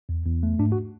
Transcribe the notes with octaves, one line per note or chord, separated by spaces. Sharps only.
E2
E2
A3
G#2 D4
F#4